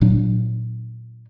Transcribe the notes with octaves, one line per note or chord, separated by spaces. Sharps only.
A#2 F#3 D4